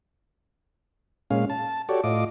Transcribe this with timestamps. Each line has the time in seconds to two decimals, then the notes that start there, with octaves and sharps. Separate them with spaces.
1.31 A#2 G#3 C#4 F5
1.50 A5
1.89 F#4 G4 A4 C#5 D5
2.04 A2 F4 D#5 D6